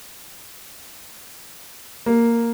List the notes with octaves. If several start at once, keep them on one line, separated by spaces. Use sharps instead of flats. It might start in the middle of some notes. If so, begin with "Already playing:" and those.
A#3